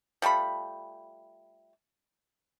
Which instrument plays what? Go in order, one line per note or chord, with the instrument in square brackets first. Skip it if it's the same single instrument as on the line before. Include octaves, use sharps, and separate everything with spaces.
[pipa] F3 G3 A3 B5